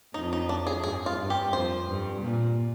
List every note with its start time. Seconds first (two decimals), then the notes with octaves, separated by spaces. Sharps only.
0.14 F2 D#4
0.33 D#4
0.49 D4
0.67 G#4
0.83 G2 G#4
1.06 F4
1.18 G2
1.30 G4
1.52 F2 C5
1.87 G2
2.22 A#2